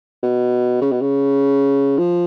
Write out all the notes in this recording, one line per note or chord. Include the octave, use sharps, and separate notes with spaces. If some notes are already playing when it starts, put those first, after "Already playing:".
B2
C#3
B2
C#3
F3